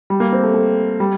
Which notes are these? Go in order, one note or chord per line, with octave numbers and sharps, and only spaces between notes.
G3
A#3
C4
A3
A3
G3